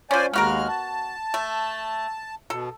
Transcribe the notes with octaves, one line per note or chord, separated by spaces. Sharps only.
F3 C#4 C5 D5 G#5
D#2 G#3 B3 F#4 A#4 F6
A5
A3
B2 A4